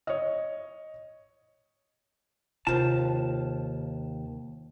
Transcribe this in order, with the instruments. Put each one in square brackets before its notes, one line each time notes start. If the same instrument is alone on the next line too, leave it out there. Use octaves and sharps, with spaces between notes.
[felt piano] C#5 D#5
[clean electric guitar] D#2 A5 [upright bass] C3 D#3 [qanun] F4 C5